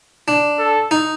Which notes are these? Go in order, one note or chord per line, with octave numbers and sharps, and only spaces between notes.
D4
A4
D#4